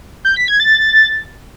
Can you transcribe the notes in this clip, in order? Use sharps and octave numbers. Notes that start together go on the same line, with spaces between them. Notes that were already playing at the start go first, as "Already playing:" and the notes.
G6
B6
G#6
A6